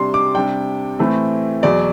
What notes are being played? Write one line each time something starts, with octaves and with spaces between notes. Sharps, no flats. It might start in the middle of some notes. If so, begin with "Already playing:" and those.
Already playing: C3 G3 D4 C6
D6
C3 G3 D4 G5
A2 E3 A3 C4
E2 B2 F#3 D5